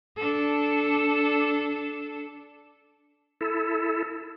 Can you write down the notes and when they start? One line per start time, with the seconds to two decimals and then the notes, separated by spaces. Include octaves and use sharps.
0.16 D4 A4
3.41 E4 A4